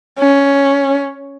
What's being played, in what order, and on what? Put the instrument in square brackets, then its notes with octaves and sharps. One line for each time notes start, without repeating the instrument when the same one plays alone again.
[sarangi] C#4